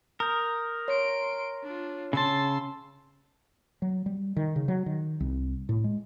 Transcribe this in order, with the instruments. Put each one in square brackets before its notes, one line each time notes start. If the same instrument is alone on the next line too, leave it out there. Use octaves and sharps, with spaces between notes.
[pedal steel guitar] A#4 [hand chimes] D#6 G6
[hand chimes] C#5 [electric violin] C6 D7
[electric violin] D4 F4
[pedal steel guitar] C#3 A5 [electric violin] C6 E6
[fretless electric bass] F#3
G3
D#3
C#3
F#3
D#3
C2
A2
G#3